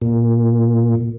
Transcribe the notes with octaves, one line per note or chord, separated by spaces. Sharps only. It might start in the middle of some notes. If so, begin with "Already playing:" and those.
A#2